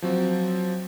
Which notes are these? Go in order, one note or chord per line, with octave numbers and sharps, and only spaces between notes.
F3 F#3 C4